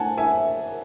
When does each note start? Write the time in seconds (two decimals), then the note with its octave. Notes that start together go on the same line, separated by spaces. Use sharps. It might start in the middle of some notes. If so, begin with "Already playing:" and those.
Already playing: F#5 G#5 A5
0.18 E5 G#5